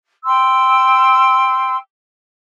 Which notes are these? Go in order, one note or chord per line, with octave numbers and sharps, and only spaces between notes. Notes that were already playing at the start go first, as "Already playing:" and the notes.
G5 C6 E6